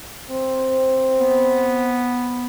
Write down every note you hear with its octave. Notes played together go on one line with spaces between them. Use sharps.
C4
B3